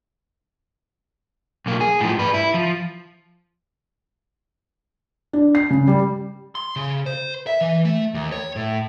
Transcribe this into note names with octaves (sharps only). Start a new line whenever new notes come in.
B1 A#3
G#4
A2 F3
G#2 B4
E4
F3
D4
C7
C#3
G3
C6
C#3
C5
E5
E3
A3
D#2
C#5
A2